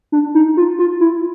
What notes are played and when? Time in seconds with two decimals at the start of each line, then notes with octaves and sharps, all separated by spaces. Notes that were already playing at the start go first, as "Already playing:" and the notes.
0.12 D4
0.35 D#4
0.57 F4
0.79 F4
1.01 E4